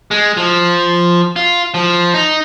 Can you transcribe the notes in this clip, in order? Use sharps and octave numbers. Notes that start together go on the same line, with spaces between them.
G#3
F3
F4
F3
D#4